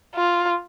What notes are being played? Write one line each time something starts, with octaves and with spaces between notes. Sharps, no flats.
F4